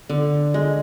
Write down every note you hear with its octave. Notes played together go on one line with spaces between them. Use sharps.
D3
G#3